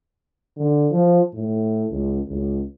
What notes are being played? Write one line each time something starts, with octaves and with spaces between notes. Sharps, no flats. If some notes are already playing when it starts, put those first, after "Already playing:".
D3
F3
A2
C#2
C#2